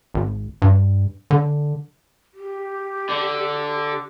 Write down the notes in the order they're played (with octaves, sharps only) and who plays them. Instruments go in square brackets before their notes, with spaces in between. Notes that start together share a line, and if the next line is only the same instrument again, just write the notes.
[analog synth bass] G#1
G2
D3
[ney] G4
[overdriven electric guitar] D3